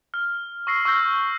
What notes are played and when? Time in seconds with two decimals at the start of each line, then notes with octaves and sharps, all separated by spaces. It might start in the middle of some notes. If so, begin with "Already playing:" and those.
0.14 F6
0.67 C#6 E6 A#6 C7
0.85 C#6 E6 F6 G6 A#6